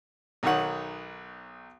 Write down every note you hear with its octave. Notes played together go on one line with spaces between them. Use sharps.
B1 D#3 C#5 F#5